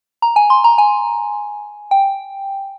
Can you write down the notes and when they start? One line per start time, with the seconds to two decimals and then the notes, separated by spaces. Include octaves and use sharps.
0.22 A#5
0.36 G#5
0.50 C6
0.64 A#5
0.78 G#5
1.91 G5